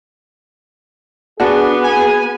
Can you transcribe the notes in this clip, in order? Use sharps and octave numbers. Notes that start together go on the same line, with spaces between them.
B3 D4 F#4 G#4
G#5